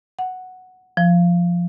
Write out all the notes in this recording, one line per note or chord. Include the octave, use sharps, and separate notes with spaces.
F#5
F3